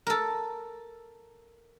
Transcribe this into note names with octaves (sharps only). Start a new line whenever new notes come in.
A4 A#4